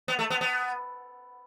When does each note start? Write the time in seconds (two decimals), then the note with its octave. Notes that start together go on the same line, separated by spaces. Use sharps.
0.08 B3
0.19 A3
0.30 B3
0.41 B3